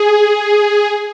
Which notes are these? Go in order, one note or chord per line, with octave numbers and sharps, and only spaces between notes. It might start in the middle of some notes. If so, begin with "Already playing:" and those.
Already playing: G#4